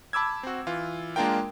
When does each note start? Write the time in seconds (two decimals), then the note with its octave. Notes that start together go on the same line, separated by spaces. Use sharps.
0.13 A5 B5 D6 E6 G#6
0.43 C4 F#4
0.67 E3 F4
1.16 G#3 A#3 D4 F4 A#4 G5